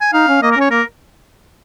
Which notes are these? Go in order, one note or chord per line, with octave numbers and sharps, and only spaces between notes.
G#5
D#4 F5
C#4
A#3 D#5
A#4
C#4 C#5
A#3 A#4